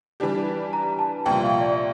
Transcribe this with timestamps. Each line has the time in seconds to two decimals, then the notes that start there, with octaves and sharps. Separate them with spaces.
0.20 E3 G3 D4 G4
0.73 A#5
0.99 A5
1.25 C2 A#2 F3 G5
1.43 F5
1.61 D5